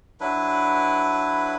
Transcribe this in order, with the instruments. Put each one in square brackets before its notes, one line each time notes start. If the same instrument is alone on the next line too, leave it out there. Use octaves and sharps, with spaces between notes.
[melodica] F#3 D4 E4 B4